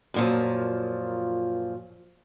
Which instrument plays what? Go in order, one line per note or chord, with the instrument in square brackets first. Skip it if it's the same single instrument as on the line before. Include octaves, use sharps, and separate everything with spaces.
[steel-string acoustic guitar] F#2 A#2 F3